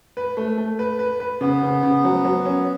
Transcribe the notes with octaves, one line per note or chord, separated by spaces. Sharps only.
B4
A3
A3
B4
B4
B4
C#3 B3
C#3
C#3
F#3
F#3
C#4